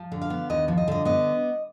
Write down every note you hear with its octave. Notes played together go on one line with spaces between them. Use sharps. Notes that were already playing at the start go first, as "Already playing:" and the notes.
Already playing: F3
D3
F5
B3
D#2 D#5
F3
D#5
D3 D#5
B3 D#5